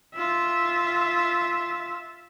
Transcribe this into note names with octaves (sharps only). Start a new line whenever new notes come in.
F4 E5